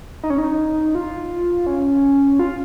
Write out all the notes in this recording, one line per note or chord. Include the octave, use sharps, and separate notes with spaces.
D#4
C#4
D#4
F4
C#4
F4